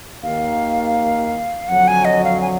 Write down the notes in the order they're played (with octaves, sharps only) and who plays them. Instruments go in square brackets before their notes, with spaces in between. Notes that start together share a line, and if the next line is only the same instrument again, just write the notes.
[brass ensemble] D#2 D#3 A#3 [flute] F5
[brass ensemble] F2 D3 F#3 [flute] F#5
[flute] G#5
D#5
F5
G#5